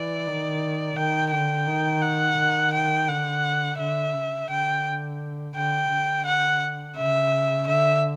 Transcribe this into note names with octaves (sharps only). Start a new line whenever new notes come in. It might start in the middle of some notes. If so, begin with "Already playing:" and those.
Already playing: E3 D5
D#3
D#3 G5
D3 G5
D#3
F#5
D#3
G5
D3 F#5
D3 E5
C#3
D3 G5
D3 G5
D3
F#5
C#3 E5
D3 E5